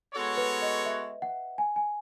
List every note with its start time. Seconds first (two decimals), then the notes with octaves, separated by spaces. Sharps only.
0.13 G#3 B3 F#4 A4 C#5
0.37 B4
0.62 D#5
0.86 E5
1.22 F#5
1.58 G#5
1.76 G#5